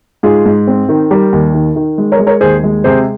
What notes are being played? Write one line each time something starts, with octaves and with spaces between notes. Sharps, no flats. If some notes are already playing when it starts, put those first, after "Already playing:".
G#2 F4 G#4
G#2
C4
D#3
G3 G4 A#4
D#2
D#3
D#3
G#3
A#4 C#5
G#3
A#4 C#5
D#2 G#4 C5
G#3
C3 G#4 C5